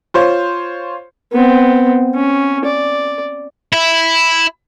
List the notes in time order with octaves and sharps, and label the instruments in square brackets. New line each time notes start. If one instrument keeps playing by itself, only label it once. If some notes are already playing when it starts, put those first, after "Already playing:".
[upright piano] F4 C5 C#5
[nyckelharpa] B3 C4
C#4
D5
[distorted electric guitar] E4 E5